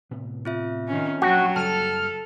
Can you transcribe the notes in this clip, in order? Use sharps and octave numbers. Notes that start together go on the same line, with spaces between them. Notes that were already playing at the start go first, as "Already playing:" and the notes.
A2 C3 B3
C4 F4 E5
D#3 C#4
A#1 F#3 F#4 F#5 G5 A5
F#1 G3 A4 A5 F6